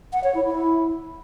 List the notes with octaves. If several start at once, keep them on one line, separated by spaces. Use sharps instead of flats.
F#5
C#5
E4
E4